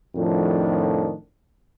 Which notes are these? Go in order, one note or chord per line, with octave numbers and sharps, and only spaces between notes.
F2 A2 D#3 F3 D4